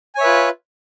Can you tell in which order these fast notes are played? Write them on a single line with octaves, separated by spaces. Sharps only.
G#5 C#5 E5 B4 F4